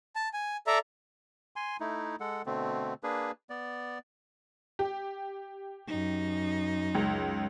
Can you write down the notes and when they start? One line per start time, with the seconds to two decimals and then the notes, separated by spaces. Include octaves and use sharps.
0.16 A5
0.34 G#5
0.67 A4 D5 E5 A#5
1.56 G#5 C6
1.80 A3 D#4 E4
2.20 G#3 A4 F#5
2.46 B2 D3 A3 C4
3.03 A#3 D4 G#4 B4
3.50 B3 D5
4.79 G4
5.88 F#2 D#4
6.95 C#2